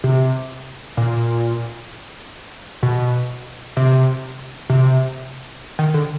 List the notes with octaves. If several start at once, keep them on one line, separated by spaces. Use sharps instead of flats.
C3
A#2
B2
C3
C3
D#3
D3